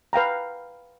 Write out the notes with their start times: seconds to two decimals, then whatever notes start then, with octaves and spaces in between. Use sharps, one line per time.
0.13 B4 F5 G5 A#5